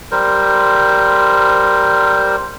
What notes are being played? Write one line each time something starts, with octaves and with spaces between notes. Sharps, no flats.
G3 A#4 C5